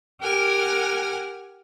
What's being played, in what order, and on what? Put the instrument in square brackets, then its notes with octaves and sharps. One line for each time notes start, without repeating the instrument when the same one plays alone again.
[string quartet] G4 A#4 F#5 G#5 F6